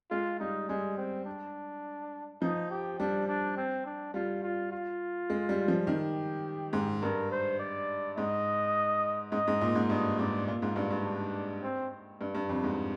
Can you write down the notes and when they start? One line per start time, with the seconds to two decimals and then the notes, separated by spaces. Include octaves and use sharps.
0.11 G#3 F4
0.40 G3 D#4
0.69 G3 G#3
0.98 C4
1.26 D4
2.42 F3 D#4
2.70 G4
2.99 G3 D4
3.28 D4
3.57 C4
3.86 D4
4.14 G3 F4
4.43 F4
4.72 F4
5.30 G#3
5.49 G3
5.68 F3
5.87 D#3 G4
6.73 G#2
7.02 G2 A#4
7.31 C5
7.60 D5
8.17 G#2 D#5
9.32 G#2 D#5
9.48 G#2
9.61 A#2
9.75 G#2
9.90 G2 D#5
10.19 G#2 D5
10.47 A#2 F4
10.62 G#2
10.76 G2
10.91 G2
11.05 D4
11.63 C4
12.21 G2
12.35 G2
12.49 F2
12.64 G#2